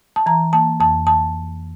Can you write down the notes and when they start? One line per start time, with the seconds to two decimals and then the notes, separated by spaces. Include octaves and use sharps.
0.16 A5
0.26 E3 A#5
0.53 A#3 A5
0.80 F2 A5
1.07 A5